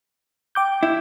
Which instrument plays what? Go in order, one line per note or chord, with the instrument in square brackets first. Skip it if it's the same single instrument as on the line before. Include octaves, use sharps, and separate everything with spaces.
[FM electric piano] G5 D6 G6
[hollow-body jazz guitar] E4